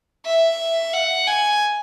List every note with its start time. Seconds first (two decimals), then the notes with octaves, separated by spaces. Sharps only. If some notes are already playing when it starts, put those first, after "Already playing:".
0.26 E5
0.93 F#5
1.27 G#5